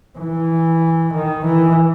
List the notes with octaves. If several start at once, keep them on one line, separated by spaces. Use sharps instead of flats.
E3
D#3
E3